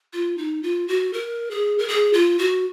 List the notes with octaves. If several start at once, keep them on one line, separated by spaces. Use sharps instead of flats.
F4
D#4
F4
F#4
A#4
G#4
A#4
G#4
F4
F#4